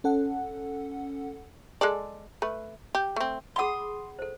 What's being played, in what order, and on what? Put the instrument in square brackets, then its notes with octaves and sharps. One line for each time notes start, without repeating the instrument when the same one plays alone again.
[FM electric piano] C#4 A4 F#5
[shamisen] G#3 A4 D5
A3 B4
G4
A3 C4
[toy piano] G#4 F#5 B5 [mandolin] C6 D#6
[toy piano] A4 C5